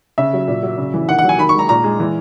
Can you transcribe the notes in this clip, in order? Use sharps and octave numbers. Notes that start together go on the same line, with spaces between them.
C#3 E5
F#3
A#2
F#3
C#3
E3
D#3 F#5
F#5
F#3
G#5
D#3 B5
C#6
G#3
A#5
A#2 A#5
G#3
E3